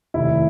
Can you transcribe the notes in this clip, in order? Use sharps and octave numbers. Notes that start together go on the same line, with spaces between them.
F1 D#2 D#3 E4